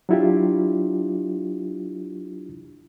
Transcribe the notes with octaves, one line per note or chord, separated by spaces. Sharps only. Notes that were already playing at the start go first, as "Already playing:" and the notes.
F#3 D4 E4 F4 G4